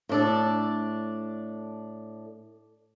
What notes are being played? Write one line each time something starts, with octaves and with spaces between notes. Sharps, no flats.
A2 D4 A4